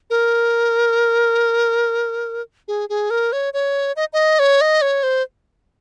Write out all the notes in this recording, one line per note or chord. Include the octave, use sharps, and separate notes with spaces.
A#4
G#4
G#4
A#4
C#5
C#5
D#5
D#5
C#5
D#5
C#5
C5